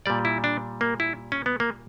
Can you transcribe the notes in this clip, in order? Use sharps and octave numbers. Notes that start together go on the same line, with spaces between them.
A#2 G3 D5
E4
D4
A#3
E4
C#4
B3
A#3